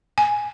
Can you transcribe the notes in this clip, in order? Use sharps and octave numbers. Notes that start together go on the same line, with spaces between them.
G#5